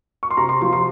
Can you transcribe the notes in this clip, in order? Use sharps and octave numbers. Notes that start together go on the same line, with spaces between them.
C#6
C6
C3 A#5
C6
F3 C6
C6